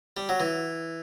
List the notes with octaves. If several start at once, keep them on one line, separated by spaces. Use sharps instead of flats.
G3
F#3
E3